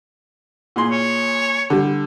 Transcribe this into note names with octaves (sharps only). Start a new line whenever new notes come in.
A#2 G#4 C6
C#5
D3 G3